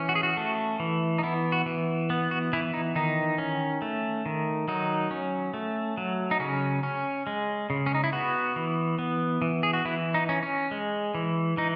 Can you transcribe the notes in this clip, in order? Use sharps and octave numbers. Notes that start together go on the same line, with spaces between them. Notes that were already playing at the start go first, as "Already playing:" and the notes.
Already playing: E3 C#4
F#4
G#4
F#4
A3
E3
D#4
B3 E4
F#4
E3
B3
F#4
E3 E4
D#4
D#3 D#4
C#4
A3
D#3
F#3 D#4
C#4
A3
F#3
D#4
C#3 C#4
C#4
G#3
C#3
C#4
D#4
E4
B3 F#4
E3
B3
E3
G#4
F#4
E3 E4
D#4
C#4
C#4
G#3
E3
E3 D#4